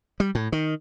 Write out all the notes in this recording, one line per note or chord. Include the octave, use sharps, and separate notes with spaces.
G3
A2
D#3